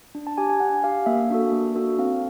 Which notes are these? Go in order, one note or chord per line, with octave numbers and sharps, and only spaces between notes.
D4
A5
G4 G#5
G#5
D4 F#5
G4 F5
A#3 E5
D4 F#4 A4
A#3
D4 F#4 A4
C4 F5